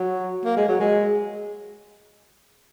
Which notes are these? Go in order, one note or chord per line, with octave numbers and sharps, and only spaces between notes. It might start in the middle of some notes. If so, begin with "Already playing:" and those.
Already playing: F#3
A#3
G#3
F#3
G#3